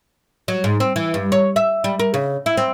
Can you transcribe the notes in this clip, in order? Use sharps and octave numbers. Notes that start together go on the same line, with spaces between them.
F#3
G#2
C4
E3
G2
C#5
E5
G3
A#4
C#3
E4
C4